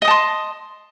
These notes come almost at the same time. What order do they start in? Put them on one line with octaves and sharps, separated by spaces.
D#5 D#6 A5 C6